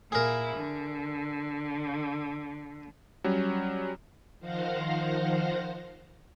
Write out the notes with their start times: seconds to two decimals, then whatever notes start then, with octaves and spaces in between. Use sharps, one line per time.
0.12 A#2 E4 G#4 A#4
0.56 D3
3.24 F#3 G3 C#4
4.39 D#3 F3 C5 F5 F#5 A#6